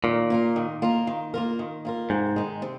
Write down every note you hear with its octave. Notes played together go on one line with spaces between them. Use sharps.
A#2 D#3
A#3 F4 A#4
D#3
A#3 F4 A#4
D#3
A#3 F4 A#4
D#3
A#3 F4 A#4
G#2 C3
D#3 G#3
C3